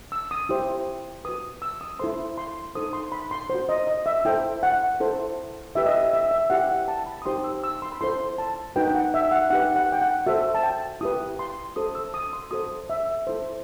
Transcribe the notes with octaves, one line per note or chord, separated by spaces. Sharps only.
E6
D#6
E4 G4 C5
F#4 B4 D#6
E6
D#6
E4 A4 C5 C6
C6
D#4 A4 C5 D#6
C6
B5
C6
F#4 C5
D#5
D#5
E5
E4 A4 C5 G5
F#5
E4 A4 C5
E4 G4 B4 E5
D#5
E5
E5
E5
E4 G4 C5 F#5
F#5
A5
B5
D#6
D#4 G4 C5 C6
E6
E6
C6
B5
E4 A4 C5 C6
A5
D#4 F#4 B4 G5
G5
F#5
E5
F#5
D#4 G4 B4 F#5
F#5
G5
F#5
F#4 A4 C5 E5
A5
G5
E4 G4 B4 D#6
C6
F#4 A4 C5 D#6
E6
D#6
C6
F#4 A4 C5 D#6
E5
E4 A4 C5